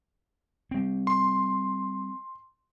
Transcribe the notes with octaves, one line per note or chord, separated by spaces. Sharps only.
G3 C4
C6